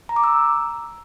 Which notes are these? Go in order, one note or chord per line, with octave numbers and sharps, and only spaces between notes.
A#5
D6
E6